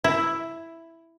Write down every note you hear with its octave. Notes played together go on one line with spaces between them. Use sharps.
E4